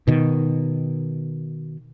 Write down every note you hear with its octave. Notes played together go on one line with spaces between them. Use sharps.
B2 D#3